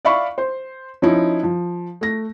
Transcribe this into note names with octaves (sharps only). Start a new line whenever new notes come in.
D5 E5 F5 B5 C#6
C5
F3 C#4 D#4 E4
F3
A3 A#6